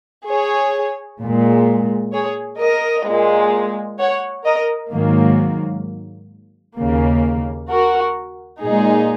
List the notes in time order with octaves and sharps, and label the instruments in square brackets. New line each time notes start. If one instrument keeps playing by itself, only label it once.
[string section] G#4 C#5
A#2 G#3
G#4 C#5
A#4 D#5
A#2 G#3
C#5 F#5
A#4 D#5
G#2 D#3 F#3 A#3
D#2 C#3 A#3
F#4 A#4
A#2 G#3 D#4 G#4